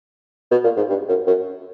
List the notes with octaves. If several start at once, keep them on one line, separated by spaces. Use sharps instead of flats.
B2
A#2
G#2
G2
F#2
F#2